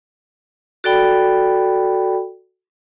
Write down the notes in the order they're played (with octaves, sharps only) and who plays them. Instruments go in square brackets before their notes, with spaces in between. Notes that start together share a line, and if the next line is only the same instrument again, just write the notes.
[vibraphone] F#4 A4 D5 G5 B5